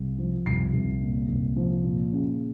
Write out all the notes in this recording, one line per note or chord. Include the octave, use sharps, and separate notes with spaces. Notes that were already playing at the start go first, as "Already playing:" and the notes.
Already playing: C2
F3
C2 C7
C2
A#2
C2
F3
A#2
C#3